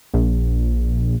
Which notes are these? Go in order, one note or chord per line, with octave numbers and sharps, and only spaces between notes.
A#1